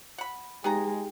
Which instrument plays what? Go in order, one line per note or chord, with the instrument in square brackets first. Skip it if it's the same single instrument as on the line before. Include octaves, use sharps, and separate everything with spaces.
[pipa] F#5 B5
[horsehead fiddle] G#3 [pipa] B3 G#4 A#5 [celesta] D#4 G4 G5